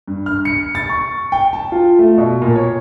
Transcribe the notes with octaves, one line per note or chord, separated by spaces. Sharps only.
G2
F6
C#7
A6
C#6
G5
A5
F4
A3
B2
A#2
C#5